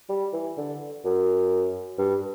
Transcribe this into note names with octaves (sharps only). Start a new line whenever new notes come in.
G3
E3
D3
F#2
G2